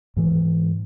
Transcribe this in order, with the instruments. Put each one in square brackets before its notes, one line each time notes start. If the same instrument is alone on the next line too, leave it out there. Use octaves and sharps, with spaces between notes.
[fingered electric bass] G#2 E3